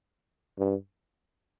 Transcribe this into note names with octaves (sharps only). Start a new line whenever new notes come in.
G2